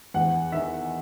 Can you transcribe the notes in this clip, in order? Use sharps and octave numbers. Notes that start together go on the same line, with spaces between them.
E2 F#5
D#3 E5